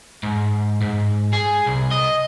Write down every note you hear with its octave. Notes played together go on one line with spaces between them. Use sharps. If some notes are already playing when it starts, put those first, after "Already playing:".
G#2
G#2
G#4
C2
D#5